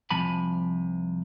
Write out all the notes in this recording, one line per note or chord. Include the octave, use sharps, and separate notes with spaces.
C2 C3 F3 G#5 A5 B5